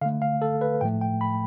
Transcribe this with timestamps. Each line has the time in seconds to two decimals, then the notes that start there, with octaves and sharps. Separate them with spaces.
0.01 D3 F5
0.05 A3
0.22 F5
0.42 A4
0.61 B4
0.81 A2 F3 A3 G5
1.02 G5
1.21 B5